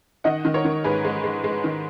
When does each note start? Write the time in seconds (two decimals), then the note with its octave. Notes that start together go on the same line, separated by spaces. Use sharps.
0.24 D#3 D#5 F#5
0.45 D#3
0.54 A#4 C#5
0.65 D#3
0.84 G#2 G#4 B4
1.05 G#3
1.24 G#3
1.44 G#3
1.64 D#3